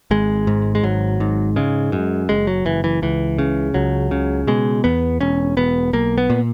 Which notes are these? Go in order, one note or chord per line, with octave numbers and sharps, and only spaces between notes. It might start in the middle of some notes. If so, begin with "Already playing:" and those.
G#1 G#3
G#2
G#3
G#1 F#3
G#2
C#3 G#3
F#2
F#1 G#3
F#3
F#1 E3
E3
C#2 E3
C#3
C#2 F#3
C#3
B2 G#3
E2 B3
E1 C#4
E1 B3
B1 A#3
B3
A#2